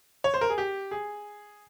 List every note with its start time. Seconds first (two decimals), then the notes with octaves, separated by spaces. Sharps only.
0.24 C#5
0.34 C5
0.41 A#4
0.50 G#4
0.58 G4
0.91 G#4